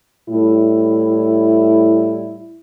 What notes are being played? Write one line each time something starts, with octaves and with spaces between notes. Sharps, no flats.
A2 G3 E4